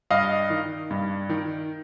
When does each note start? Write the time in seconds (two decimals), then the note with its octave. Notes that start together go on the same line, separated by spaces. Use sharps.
0.11 G2 D#5 F5
0.50 D#3
0.91 G2
1.29 D#3